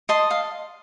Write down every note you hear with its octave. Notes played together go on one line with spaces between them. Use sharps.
D#5 A5 C6
F5